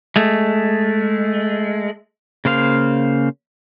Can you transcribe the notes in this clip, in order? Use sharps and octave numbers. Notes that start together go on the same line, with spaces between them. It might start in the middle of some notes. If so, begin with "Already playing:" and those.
G#3 A3
C#3 A#3 C5 F5